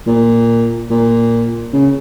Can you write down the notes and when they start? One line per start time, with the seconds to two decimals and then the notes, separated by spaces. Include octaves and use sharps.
0.07 A#2
0.90 A#2
1.73 C#3